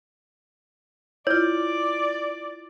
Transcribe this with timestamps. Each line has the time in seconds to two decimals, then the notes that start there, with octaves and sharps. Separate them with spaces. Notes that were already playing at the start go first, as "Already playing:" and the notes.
1.27 E4 F4 C#5 D5